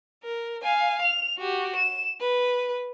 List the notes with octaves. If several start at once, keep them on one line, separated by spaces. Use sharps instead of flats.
A#4
F5 G#5
F7
F#4 G4
E7
B4